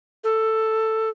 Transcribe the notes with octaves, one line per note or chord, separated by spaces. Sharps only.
A4